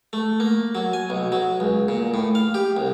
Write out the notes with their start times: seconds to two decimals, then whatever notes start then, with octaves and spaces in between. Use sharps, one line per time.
0.13 A3
0.40 A#3
0.75 F#3
0.93 G#5
1.10 B1
1.32 F#3
1.60 C#2
1.88 A#2
2.14 A2
2.35 F5
2.54 G4
2.77 C2